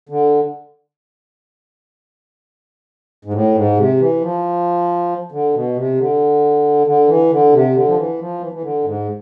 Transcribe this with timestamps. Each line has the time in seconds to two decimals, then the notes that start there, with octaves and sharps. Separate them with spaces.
0.09 D3
3.25 G#2
3.33 A2
3.55 G#2
3.77 C3
4.00 E3
4.21 F3
5.32 D3
5.54 B2
5.76 C3
5.98 D3
6.87 D3
7.08 E3
7.31 D3
7.53 C3
7.74 D3
7.88 F3
7.97 E3
8.19 F3
8.41 E3
8.53 E3
8.62 D3
8.84 G#2